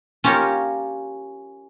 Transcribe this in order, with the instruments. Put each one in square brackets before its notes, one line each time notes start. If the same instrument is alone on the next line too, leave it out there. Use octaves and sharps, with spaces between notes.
[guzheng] C#4 F4 G4 A#4 C#5